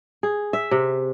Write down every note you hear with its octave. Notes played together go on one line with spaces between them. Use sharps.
G#4
E5
C3